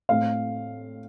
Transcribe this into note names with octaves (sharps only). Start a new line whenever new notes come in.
A2 A3 C4 F5